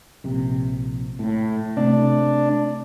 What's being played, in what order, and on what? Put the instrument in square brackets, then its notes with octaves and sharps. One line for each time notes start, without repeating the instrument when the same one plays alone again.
[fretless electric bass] A#1 C3
A2
[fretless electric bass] C3 A3 [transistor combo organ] D4